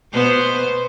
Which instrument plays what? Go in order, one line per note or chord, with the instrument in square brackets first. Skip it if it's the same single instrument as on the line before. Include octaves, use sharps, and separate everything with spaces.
[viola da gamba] B2 B3 C5